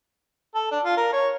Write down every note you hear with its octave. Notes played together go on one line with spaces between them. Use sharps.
A4
D4
F4
A#4
C#5